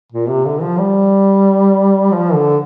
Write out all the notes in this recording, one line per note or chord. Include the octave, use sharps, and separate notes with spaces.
A#2
C3
D3
F3
G3
F3
D3